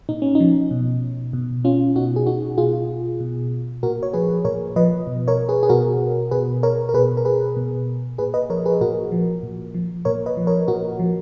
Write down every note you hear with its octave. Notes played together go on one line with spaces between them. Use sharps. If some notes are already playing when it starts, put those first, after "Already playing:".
A#2 D#4
C#4
D#4
F3
B2
B2
C#4 F4
B2 D#4 F#4
G#4
D#4 F#4
B2 F4 G#4
B2
A#2 F#4 A#4
C#5
F3 G#4 B4
A#2 A#4 C#5
F3 B4 D#5
B2
A#4 C#5
G#4 B4
G#4
B2 F#4 A#4
B2 G#4 B4
A#4 C#5
A#4
B2 G#4 B4
A#4
G#4 B4
B2
A#2 G#4 B4
B4 D#5
F3 A#4 C#5
G#4 B4
A#2 F#4 A#4
F3
A#2
F3
A#2 A#4 C#5
B4 D#5
F3
A#4 C#5
A#2 F#4 A#4
F3